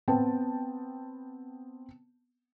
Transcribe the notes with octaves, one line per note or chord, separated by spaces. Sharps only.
B3 C4 B4 G5 A5